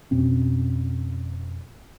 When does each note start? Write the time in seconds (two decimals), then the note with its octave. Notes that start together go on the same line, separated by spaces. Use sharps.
0.11 F2 B2 C4 C#4